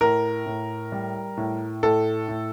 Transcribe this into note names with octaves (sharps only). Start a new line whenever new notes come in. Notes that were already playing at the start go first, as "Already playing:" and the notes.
A2 A#4
A2
G3
A2
A2 A4
A2